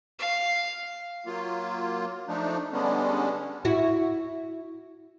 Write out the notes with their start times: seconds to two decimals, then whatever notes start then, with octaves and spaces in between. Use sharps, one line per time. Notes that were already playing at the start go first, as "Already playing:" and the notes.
0.19 F5
1.26 F#3 A#3 F4
2.28 F3 A3 D4 D#4
2.73 D3 G3 G#3 B3 C#4 D4
3.65 E4 F#4